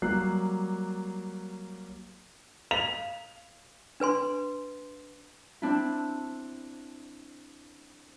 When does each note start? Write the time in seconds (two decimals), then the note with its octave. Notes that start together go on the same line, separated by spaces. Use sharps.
0.02 F#3 G3 A#3 F#6 C7
2.71 F5 F7
4.00 D4 B4 G#5 C6
5.62 C4 D4 E4